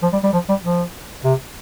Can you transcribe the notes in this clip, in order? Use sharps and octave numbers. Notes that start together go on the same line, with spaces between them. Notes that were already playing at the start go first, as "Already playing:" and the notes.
F3
G3
G3
F3
G3
F3
C3